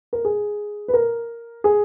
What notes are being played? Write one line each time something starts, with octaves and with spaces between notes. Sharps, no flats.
A#4
G#4
B4
A#4
G#4